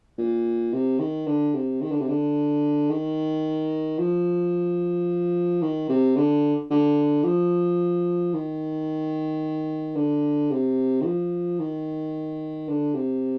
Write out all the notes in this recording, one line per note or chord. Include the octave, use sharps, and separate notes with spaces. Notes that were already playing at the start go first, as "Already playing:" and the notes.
A#2
C3
D#3
D3
C3
D#3
D3
C3
D3
D#3
F3
D#3
C3
D3
D3
F3
D#3
D3
C3
D#3
F3
D#3
D3
C3